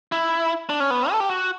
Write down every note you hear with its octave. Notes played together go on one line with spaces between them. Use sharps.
E4
D4
C#4
B3
A4
G4
F#4